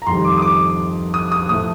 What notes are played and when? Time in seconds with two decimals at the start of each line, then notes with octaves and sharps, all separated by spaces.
0.02 A#5
0.06 F2 D#3 G3 C6
0.25 D6
0.37 D#6
0.42 D6
1.14 D#6
1.32 D#6
1.49 A2 F3 A3 D#6